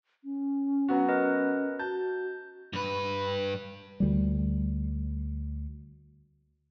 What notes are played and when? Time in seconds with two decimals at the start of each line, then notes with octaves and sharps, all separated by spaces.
0.24 C#4
0.88 F#3 B3 F#4
1.09 C#4 A#4 B4 D#5
1.79 F#4 A5 G6
2.73 G2 B4
4.00 D2 G3